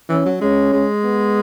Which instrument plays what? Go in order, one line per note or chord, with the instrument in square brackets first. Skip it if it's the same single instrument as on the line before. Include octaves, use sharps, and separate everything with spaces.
[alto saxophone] E3 [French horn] C#4
[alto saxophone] F#3
[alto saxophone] G#3 [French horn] C#4
[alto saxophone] G#3
[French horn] B3